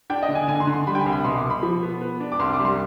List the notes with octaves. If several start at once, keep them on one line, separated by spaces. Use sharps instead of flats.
D4 G5
D#5
D3
G#5
D3 G#5
C6
D3
C6
G3 B5
G5
G#5
C2
B5
B2 C6
D6
B2
B5
F3
B3
B3
D4
D6
C2 C6
D6
G3
C6